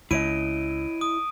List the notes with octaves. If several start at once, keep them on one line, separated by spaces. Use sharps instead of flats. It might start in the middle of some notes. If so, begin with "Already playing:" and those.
C#2 E4 C#5 D#5 D7 D#7
D#6